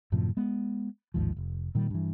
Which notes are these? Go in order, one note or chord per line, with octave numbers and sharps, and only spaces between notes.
F#2 A2 C3 F3
G#3 B3
A1 D#2 G#2 F3
F1
A#2 D#3 G3
G2 E3